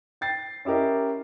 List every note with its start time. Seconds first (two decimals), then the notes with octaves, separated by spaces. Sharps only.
0.21 G5 A6 C7
0.65 C#4 E4 G4 A#4 D#5